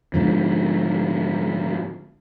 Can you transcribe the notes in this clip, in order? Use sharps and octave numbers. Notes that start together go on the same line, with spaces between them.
G#2 D3 F3